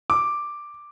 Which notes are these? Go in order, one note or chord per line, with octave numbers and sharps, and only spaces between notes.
D6